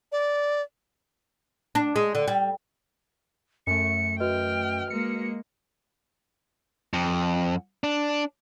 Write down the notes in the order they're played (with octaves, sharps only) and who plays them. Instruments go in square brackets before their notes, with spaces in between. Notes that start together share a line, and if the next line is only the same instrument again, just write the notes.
[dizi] D5
[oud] D4
G#3
D3
G3
[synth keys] F#2 A3 [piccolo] C#7
[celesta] F#4 B4 D#5 [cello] G5 [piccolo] F6
[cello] G#3 A#3 [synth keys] C#7
[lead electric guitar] F2
D4